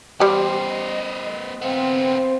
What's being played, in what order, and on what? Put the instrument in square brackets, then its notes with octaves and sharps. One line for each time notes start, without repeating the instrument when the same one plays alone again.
[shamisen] G3 G4 [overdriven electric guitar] B3 C5
[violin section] D#5
[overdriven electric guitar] B3 F4 [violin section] C4